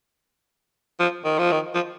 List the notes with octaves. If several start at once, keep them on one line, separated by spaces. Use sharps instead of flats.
F3
D#3
F3
D#3
F3